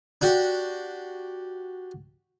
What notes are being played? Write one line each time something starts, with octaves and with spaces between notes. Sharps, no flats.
D4 F#4 G4